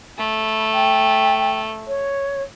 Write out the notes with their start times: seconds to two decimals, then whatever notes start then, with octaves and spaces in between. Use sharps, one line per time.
0.18 A3 B5
0.72 G5
1.87 C#5